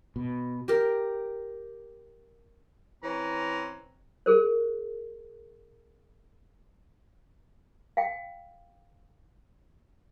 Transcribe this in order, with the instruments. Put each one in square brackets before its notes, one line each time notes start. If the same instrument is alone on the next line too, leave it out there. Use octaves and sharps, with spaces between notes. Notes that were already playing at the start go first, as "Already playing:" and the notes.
[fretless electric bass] B2
[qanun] G4 A#4
[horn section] E3 C4 C#4 A#5
[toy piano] G#4 A#4 C5
F5 G5